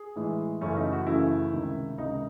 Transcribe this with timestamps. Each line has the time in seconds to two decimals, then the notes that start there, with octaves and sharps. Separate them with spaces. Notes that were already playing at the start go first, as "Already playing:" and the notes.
Already playing: G#4
0.16 A2 E3 G#3
0.61 F#2 C#3 E3 A3 C#4
0.77 D#4
0.92 F#4
1.06 F#2 C#3 E3 A3 E4
1.52 C#2 C3 D#3
1.98 C#2 C3 D#3 D#4